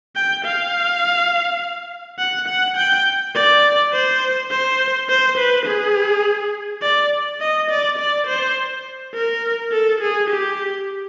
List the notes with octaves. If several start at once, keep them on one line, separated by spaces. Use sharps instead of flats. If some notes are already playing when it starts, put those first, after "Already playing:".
G5
F5
F#5
F#5
G5
D5
C5
C5
C5
B4
G#4
D5
D#5
D5
D5
C5
A#4
A4
G#4
G4